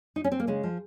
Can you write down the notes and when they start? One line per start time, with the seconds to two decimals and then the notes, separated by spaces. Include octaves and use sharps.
0.16 D#4
0.24 C#4
0.32 C4
0.40 A#3
0.47 C#3 G#3
0.63 F3